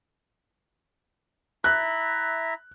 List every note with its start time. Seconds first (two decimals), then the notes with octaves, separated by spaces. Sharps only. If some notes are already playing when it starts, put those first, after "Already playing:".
1.64 E4 E5 A#5 F#6